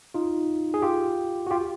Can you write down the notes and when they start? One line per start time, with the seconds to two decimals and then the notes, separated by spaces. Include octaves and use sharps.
0.14 D#4 F4
0.74 G#4
0.82 F4 G4
1.47 F#4
1.51 F4 G4